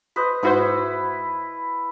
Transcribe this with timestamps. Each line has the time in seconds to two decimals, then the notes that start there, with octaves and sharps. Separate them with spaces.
0.16 B4 C5 D#5
0.43 G#2 E4 F#4 B4 C5 C#6